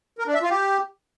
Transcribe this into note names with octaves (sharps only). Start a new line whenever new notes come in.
A#4
D4
E5
F4
G4